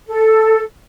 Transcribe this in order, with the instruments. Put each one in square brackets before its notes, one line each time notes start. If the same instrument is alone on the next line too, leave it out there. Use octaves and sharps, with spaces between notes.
[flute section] A4